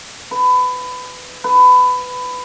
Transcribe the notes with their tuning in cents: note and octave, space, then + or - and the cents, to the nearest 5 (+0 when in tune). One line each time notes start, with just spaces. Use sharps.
B4 +25
B4 +20